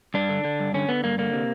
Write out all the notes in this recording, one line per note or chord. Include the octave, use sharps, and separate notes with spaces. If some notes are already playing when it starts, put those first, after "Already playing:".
G2 D4
D3
D3
G2
D3 C#4
D3 B3
G2 A#3
D3 A#3
C3